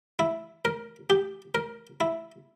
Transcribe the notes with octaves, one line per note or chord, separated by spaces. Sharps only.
E4
A#4
G4
A#4
E4